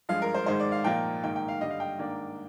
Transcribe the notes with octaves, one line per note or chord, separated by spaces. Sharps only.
G2 F3 G#3 F5
A#4
C5
G#2 D#3 G#3 C5
D5
F5
A#2 F3 A#3 D#4 G5
G#2 D#3 A#3 D#4 G5
G5
F5
G2 D3 G3 D#5
F5
G5
G#2 D#3 A#3 D4